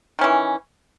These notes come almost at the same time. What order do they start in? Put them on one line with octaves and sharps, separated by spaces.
D#3 C#4 E3